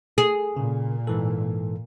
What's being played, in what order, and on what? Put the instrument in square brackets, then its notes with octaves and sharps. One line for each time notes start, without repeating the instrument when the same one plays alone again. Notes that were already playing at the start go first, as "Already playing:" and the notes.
[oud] G#4
[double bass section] A#2 [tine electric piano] C#3
[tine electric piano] G#2 E3 A4